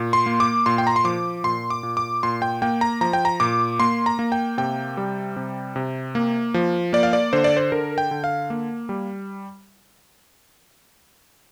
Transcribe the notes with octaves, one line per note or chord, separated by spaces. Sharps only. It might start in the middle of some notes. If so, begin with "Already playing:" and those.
Already playing: A#2
C6
A#3
D6
A#2 C6
G5
A#5
C6
F3 D6
A#2 C6
D6
A#2
D6
A#2 C6
G5
A#3 G5
A#5
F3 A#5
G5
A#5
A#2 D6
A#3 C6
A#5
A#3
G5
C3 G5
G3
C3
C3
A#3
F3
A#3 D5
F5
D5
D3 C5
D5
C5
D3 A#4
G5
D3
F5
A#3
G3